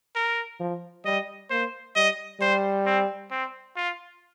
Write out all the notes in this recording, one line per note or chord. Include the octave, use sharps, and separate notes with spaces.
A#4
F3
G3 D#5
A#3 C5
G3 D#5
G3 C5
C4
C4
F4